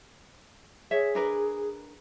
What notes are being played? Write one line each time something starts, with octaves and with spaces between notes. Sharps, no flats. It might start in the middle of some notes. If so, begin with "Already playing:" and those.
G#4 C#5 E5
D4 A#4 B4